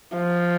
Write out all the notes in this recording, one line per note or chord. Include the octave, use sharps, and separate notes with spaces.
F3